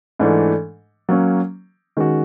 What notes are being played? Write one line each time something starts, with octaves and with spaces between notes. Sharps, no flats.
G#2 E3 A3 D4
F#3 A#3 C#4
D#3 G#3 C#4 F#4